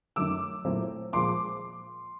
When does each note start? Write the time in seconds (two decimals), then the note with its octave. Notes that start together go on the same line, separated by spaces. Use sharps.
0.16 F#2 D#3 F#3 A3 D6 E6
0.65 A#2 F#3 A3 C4 E4
1.13 A#2 F3 G#3 C6 D6